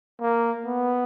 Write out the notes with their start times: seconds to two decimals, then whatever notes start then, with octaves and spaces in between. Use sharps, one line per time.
0.21 A#3
0.65 B3